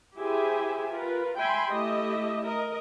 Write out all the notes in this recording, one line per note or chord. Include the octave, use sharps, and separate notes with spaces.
E4 G4 G#4 C5 E5 G#5
F4 A#4 B4
E5 G5 G#5 B5 C6
A3 E4 G4 D#5 E5
A#4 D#5